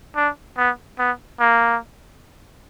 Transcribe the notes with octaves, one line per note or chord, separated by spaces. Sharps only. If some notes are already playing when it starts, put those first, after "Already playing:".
D4
B3
B3
A#3